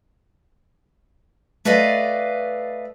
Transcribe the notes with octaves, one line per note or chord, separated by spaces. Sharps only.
A3 B4 D5 D#5 F5